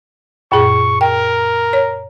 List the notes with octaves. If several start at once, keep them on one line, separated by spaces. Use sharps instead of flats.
F#2 A#2 G#4 C#6
A#4 G5
C#5